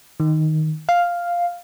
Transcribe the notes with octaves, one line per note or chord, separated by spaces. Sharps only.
D#3
F5